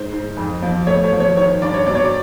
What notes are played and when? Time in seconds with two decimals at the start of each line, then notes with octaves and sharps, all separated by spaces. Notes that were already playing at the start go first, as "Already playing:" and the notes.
Already playing: G#2 C5
0.12 G#2
0.37 F2
0.62 F3
0.87 A3 C#5
1.04 C#5
1.12 F3
1.20 C#5
1.37 D#3 C#5
1.61 G2 D5
1.74 C#5
1.87 F#3 D5
1.95 C#5
2.05 D5